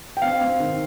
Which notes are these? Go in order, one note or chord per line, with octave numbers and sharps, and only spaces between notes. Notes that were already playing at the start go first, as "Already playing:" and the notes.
G5
C4 F5
C4
D#3